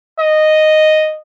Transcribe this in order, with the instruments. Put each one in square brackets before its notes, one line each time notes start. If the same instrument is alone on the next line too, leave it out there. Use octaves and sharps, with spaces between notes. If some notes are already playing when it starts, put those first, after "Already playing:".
[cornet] D#5